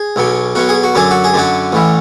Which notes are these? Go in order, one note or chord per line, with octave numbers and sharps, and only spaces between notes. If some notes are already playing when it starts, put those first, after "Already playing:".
Already playing: G#4
B1 B2 F#3
B1 B2 F#3 F#4
G#4
F#4
F#2 D3 F#3 G#4
F#4
G#4
F#2 D3 F#3 F#4
A1 A2 E3